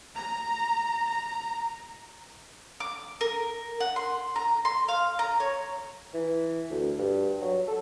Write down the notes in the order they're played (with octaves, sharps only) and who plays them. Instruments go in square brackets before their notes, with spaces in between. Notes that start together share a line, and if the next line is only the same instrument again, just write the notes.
[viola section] A#5
A#5
[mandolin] D6
A#4
F#5
C6
A#5
C6
F5
A#5
C#5
[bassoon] E3
D2
G2
F#3
A4